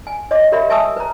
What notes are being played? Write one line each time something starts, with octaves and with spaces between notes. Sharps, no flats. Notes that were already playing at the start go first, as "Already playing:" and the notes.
G#5
C#5 D#5 D6
G4 A#4 C#5 E5 B5
E5 G#5 A5 C#6 D#6 E6
B4 A#5